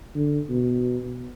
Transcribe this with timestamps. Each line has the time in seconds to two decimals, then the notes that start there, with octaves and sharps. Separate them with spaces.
0.15 D3
0.49 B2